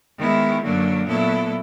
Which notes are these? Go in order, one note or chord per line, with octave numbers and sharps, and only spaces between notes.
D#3 G#3 B3 E4
F#2 D3 F#3 A#3
A#2 F#3 B3 E4 A4